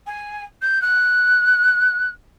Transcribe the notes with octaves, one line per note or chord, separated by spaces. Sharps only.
G#5
G6
F#6